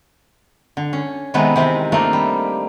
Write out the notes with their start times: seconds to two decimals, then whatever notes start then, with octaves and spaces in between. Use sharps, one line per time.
0.77 D3
0.93 C#4
1.34 C3 D#3 G#3 A3 B3 C4
1.56 C3 D#3 E3 C4
1.92 A3 A#3 D4 D#4 F4
2.13 G3